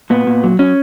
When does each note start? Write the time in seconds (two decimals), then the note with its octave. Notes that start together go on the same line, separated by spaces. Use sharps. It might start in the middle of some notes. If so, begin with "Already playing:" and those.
0.10 A#2 B3
0.27 A#2
0.44 F#3
0.59 F#3 C#4